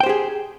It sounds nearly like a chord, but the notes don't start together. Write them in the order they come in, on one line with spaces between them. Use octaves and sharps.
G5 C5 G4 G#4